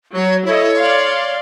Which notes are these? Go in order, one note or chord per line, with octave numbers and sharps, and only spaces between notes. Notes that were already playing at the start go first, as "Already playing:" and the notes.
F#3 C#5
E4 A4 C#5 D#5
D5 F5 C6